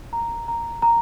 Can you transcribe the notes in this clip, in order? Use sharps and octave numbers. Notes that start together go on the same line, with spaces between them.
A#5
A#5
A#5